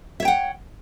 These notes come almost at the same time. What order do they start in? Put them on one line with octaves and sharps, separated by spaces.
E5 C#5 G5 F#5